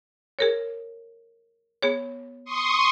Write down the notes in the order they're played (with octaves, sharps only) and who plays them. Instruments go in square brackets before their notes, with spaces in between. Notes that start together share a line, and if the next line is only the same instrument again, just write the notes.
[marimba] G#4 A#4 C#5
B3 G#4 C#5
[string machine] C6 C#6 D#6